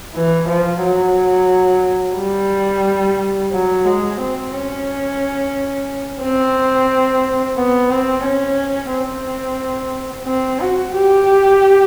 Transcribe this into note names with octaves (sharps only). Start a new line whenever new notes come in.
E3
F3
F#3
G3
F#3
G#3
C4
C#4
C4
B3
C4
C#4
C4
C4
F#4
G4